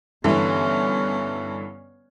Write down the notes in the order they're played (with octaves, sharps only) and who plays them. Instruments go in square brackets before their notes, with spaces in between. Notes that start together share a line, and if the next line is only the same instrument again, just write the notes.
[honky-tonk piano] G2 D3 E3 [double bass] B3 C#4